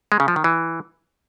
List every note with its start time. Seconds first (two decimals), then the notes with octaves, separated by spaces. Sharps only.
0.12 G#3
0.20 C#3
0.28 F3
0.36 D#3
0.44 E3